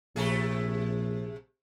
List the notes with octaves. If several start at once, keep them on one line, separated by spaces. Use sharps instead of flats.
A#1 C3 A3 G#4